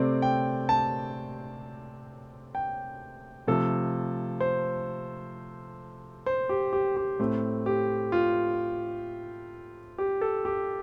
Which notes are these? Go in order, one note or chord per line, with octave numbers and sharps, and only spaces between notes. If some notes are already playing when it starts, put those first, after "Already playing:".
Already playing: C3 A3 C4 D5
G5
A5
G5
C3 F3 A3 A4
C5
C5
G4
G4
G4
A2 A3 C4
G4
F4
G4
A4
G4